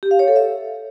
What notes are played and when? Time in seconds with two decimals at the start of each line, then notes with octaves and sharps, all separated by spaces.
0.03 G4
0.11 F5
0.19 C#5
0.28 A4
0.36 E5